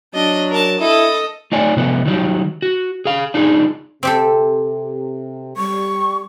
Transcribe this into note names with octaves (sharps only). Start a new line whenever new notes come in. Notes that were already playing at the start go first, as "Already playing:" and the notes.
F#3 D4 D#5
A#4 A5
E4 A4 D#5
A3 D#4 F4 C#5 D5 G#5
C3 F3 A3 B3
D#3 F#3 G3
F#4
G#4 F5
D4 D#4 F4 G#4
C3 C4 G4 A4
G3 C#6